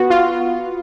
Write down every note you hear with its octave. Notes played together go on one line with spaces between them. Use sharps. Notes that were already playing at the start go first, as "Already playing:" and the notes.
Already playing: B3 F#4
F4